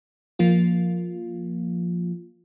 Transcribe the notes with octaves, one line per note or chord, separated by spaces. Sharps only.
F3 A#3 F4